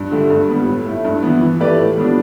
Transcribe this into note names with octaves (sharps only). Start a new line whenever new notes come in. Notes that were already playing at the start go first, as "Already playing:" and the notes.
Already playing: G2
D3 A3 G4
G2
G3 B3
A2
A3 E4
G2
E3 B3
E3
A3 G4 B4 D5
A2
G3 B3 D4